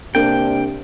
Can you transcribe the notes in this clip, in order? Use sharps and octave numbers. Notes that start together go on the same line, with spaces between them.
C3 A#3 D4 G5